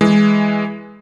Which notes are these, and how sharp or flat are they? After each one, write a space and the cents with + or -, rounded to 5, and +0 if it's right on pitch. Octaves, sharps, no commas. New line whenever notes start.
E3 +0 G#3 +0